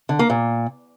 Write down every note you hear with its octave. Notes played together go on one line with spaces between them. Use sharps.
D3
A#3
A#2